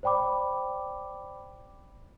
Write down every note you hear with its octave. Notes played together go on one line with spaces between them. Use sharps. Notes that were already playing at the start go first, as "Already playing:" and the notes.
C5 D5 G5 B5 D6